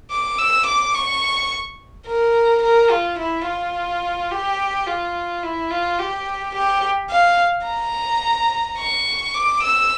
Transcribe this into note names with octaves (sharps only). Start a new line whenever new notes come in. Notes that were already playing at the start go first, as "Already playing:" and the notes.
D6
E6
D6
C#6
A#4
A#4
F4
E4
F4
G4
F4
E4
F4
G4
G4
F5
A#5
C#6
D6
E6